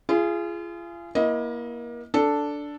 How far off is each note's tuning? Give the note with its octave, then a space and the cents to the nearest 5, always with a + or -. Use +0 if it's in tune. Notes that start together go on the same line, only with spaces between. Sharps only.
F4 -35 G#4 +0
A#3 +30 E4 +0 D#5 +20
D4 -5 A4 +0